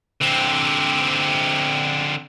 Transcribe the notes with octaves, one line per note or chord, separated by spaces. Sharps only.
D3 C4